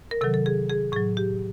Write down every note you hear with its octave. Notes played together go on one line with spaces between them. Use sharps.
A#4
C3 D#3 F#3 A4
A4
G#4
G#4
A2 F#3 G#4
G4